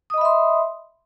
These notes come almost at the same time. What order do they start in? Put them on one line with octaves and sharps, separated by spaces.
D#6 D#5 B5 E5 C6